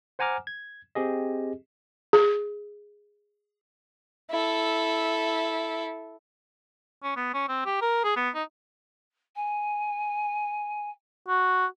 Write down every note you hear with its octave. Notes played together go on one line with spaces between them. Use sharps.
C5 F#5 G#5 A#5 D6 F6
G#6
C4 G4 G#4 D#5
G#4
E4 A4
C#4
B3
C#4
C4
G4
A#4
G#4
B3
D#4
G#5
F#4